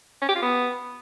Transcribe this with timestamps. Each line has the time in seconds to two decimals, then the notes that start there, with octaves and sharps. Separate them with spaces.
0.22 C#4
0.29 G4
0.35 F4
0.42 B3